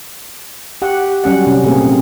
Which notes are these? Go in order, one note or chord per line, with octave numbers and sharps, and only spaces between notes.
G4 F#5
F#3 G3 C#4 F#5
C3 C#4
A#2 C#3 A3 A#3 C4 G#4